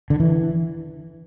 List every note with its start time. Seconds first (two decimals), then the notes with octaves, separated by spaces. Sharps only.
0.10 D3
0.20 E3